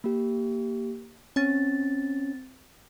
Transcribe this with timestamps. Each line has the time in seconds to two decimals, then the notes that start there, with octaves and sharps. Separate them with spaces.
0.04 A#3 G4
1.36 C4 C#4 A6